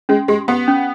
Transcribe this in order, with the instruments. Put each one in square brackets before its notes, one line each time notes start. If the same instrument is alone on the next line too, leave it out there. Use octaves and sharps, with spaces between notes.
[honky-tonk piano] G#3 [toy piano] C#4
[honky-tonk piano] G#3 [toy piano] G4
[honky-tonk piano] B3 [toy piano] G4
[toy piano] C#4